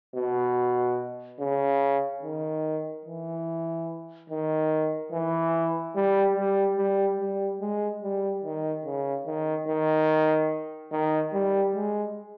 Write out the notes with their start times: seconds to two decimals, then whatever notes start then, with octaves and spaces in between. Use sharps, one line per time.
0.15 B2
1.39 C#3
2.22 D#3
3.05 E3
4.30 D#3
5.12 E3
5.95 G3
6.36 G3
6.77 G3
7.19 G3
7.61 G#3
8.02 G3
8.44 D#3
8.85 C#3
9.26 D#3
9.67 D#3
10.92 D#3
11.33 G3
11.75 G#3